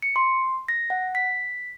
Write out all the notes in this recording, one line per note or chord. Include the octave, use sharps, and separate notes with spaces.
C#7
C6
A#6
F#5
B6